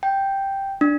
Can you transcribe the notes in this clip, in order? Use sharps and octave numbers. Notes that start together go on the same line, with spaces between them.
G5
D4